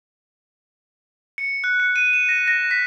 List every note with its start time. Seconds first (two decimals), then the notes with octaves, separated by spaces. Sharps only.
1.38 C#7
1.64 F#6
1.80 C#7
1.96 D#7
2.13 E7
2.29 A#6
2.48 A#6
2.71 B6